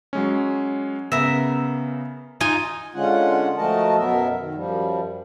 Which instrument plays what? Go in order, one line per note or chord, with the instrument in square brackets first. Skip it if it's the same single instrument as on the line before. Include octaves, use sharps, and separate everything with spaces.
[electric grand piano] F#3 G#3 C#4
[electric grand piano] C#3 B3 [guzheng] A#4 E5
[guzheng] D#4 F4 G#5
[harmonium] D3 G#3 C#4 F4 F#5
F3 A3 F#4 A#4 D#5 A5
F#2 B2 F#3 B3 A#4 E5
D#3
F#2 F3 G3